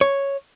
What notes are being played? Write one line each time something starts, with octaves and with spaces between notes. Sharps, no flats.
C#5